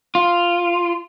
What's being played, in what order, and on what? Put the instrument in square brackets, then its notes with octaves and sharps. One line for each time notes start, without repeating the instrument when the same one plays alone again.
[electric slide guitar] F4